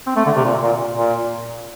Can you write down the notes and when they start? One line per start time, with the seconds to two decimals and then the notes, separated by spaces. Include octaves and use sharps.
0.07 C4
0.16 A3
0.26 D3
0.36 C3
0.45 A#2
0.62 A#2
0.96 A#2